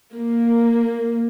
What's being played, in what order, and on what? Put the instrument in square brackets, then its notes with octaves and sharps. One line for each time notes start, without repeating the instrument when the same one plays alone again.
[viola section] A#3